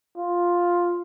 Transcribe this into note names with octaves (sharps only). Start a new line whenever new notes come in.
F4